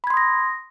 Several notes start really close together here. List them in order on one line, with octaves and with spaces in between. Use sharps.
B5 G#6 C6 D#6 A#6